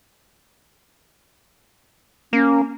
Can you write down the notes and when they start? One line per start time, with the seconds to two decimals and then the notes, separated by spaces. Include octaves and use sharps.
2.33 A#3 C#4